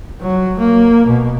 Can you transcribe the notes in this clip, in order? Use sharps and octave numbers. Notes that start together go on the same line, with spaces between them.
F#3
A#3
B2